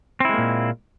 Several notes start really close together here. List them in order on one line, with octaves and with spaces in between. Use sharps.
C4 E4 G#3 A#3 A#2